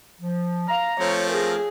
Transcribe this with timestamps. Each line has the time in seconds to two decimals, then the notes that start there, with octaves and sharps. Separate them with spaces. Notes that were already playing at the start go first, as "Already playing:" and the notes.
0.20 F3
0.68 F5 A#5
1.00 F3 A3 C4 C#5
1.30 G#4 A#4